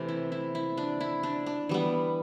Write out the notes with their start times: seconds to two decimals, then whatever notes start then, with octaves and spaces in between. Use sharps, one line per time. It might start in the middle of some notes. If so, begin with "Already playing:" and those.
Already playing: C3 E3 A3
0.09 E4
0.32 E4
0.55 E4
0.77 D4
1.00 E4
1.23 D4
1.46 D4
1.69 E3 G3 B3